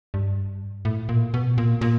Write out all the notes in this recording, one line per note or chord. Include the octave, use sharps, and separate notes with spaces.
G2
A2
A#2
B2
A#2
A#2